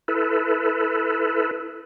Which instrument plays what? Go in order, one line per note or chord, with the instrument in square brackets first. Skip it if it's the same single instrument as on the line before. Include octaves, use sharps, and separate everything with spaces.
[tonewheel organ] E4 A4 B4